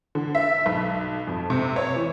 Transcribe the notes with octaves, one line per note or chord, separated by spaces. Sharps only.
D3
E5
B1
F2
C3
C#5
E3